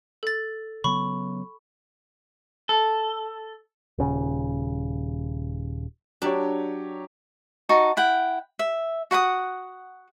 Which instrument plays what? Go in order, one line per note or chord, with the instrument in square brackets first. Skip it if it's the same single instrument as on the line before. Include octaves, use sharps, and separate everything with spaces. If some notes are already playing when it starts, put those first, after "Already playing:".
[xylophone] A4 A6
[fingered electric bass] C#3 F#3 B3 [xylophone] B5 C#6
[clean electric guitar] A4
[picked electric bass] D#1 C#3
[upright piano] F#3 G4 C#5 [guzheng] D4 D5
[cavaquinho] D#4 F#4 A5
E4 F#5 G5
E5
F#4 F#5 B5 D#6